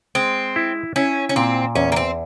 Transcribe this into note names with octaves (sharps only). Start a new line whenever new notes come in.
G#3 C4
E4
C#4 E4
C#4
A#2 C4
E2 C#4
A#3
C4